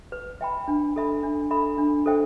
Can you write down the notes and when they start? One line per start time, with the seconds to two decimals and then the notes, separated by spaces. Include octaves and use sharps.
0.12 B4
0.41 E5 G5 B5
0.68 D4
0.96 A4 E5 B5
1.23 D4
1.51 A4 E5 B5
1.78 D4
2.06 A4 C5 E5 G5